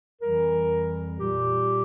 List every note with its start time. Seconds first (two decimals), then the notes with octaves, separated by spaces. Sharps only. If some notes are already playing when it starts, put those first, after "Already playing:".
0.21 F2 E3 G3 A#4
1.19 A#2 G3 G4